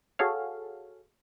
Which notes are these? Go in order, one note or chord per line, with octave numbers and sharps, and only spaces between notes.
F#4 G#4 A4 C#5 F5